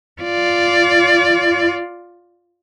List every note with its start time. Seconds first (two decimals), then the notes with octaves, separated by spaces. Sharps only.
0.22 F4 D5